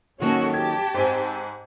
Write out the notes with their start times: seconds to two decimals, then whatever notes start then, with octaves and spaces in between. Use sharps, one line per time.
0.21 D#3 F#3 A#3 C#4 F#4 A4 C#5
0.54 G4 A5 G#6
0.94 G#2 C4 C5 G#5